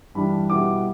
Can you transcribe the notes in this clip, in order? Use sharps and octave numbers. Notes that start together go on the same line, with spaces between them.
G2 E3 G3 D4 B5
B2 G3 B3 E4 D6